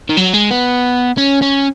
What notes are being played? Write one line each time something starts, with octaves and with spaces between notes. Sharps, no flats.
D#3
F#3
G#3
B3
C#4
C#4